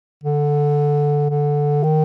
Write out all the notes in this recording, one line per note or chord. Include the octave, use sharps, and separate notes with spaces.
D3
D3
D#3